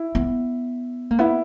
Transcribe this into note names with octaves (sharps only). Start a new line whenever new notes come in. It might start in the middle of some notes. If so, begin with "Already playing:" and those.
Already playing: E4
B3
A#3
B3 E4